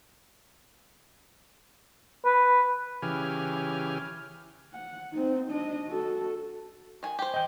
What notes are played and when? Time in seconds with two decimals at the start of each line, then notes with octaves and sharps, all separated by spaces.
2.25 B4
3.02 C#3 E3 G4 G#5 F6
4.73 F#5
5.12 C4 D#4
5.50 D4 D#5
5.87 F#4 A4
7.03 D#3 G#5
7.19 G4 C5
7.34 D#5 G5